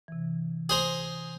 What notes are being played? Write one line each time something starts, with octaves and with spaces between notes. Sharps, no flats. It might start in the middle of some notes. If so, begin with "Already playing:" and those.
C3 E3
G#4 C5 A#5